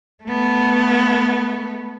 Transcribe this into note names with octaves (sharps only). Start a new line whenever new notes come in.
A3 B3